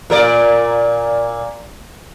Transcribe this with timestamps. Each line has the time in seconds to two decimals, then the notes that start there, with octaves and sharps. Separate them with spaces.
0.10 A#2 A#4 D5